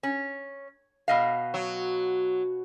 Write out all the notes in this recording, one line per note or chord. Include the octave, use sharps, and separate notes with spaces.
C#4
B2 D#5 F5
F#3